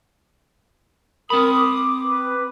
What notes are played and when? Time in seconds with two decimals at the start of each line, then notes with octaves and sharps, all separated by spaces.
1.30 C4 A#4 B5 D#6
1.57 D6
2.06 B4